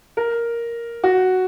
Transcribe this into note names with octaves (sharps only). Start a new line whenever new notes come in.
A#4
F#4